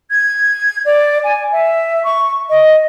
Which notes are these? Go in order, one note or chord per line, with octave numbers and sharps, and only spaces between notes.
G#6
D5
G#5
E5
C#6
D#5